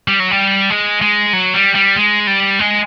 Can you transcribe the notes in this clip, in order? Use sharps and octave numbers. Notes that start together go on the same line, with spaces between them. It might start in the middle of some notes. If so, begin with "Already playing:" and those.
G3
F#3
G3
G#3
G#3
F#3
G3
G3
G#3
G3
G#3